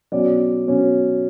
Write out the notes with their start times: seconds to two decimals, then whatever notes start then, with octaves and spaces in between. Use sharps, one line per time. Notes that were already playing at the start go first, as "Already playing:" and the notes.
0.12 B2 F#3 C#4 D5
0.67 B2 F#3 C#4